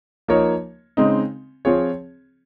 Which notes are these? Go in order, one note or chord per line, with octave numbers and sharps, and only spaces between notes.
F3 A#3 D#4 A#4 C#5
C#3 G#3 C4 D#4
F3 C4 F4 G#4 C#5